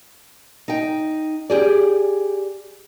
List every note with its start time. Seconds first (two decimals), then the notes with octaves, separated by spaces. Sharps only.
0.68 D#4 G5
1.50 G4 G#4 D5